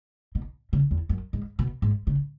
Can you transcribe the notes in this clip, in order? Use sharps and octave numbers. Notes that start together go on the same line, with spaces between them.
B2
C#3
E2
F#2
G#2
B2
G#2
C#3